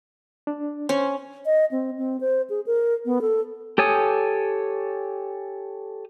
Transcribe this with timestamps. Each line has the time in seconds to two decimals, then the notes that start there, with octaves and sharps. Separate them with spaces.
0.47 D4
0.89 C#4 C5
1.46 D#5
1.71 C4
1.97 C4
2.21 C5
2.50 G#4
2.67 A#4
3.05 B3
3.21 A4
3.78 G4 A4 C#5 G#5 D#6